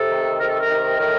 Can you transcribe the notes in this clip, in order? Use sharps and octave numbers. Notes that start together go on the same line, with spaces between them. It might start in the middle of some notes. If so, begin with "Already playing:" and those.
Already playing: C3 A4
D#3
C3 A#4
A4
A#4
D#3
A2 A#4